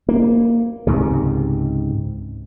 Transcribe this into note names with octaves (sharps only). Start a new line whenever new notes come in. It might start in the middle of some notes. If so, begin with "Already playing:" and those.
A#3
C#2 G#2 C3